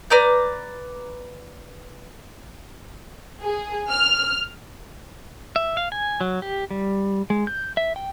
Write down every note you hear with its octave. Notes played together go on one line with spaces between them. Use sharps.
B4 D5 A#5 G6
G#4
F6
E5
F5
G#5
F#3
G4
G3
G#3
G6
E5
G5